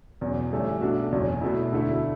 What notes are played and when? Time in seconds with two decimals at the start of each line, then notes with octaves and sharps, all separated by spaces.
0.21 E2 B2 F#3 C#4
0.52 G2 E3 A3 C#4 G4
0.81 B1 B2 A3 D4 F#4
1.12 F#1 E2 B2 F#3 C#4
1.41 B2 A3 E4
1.72 E1 D2 D3 A3 E4